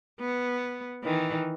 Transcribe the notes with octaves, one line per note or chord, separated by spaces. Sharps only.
B3
D#3 E3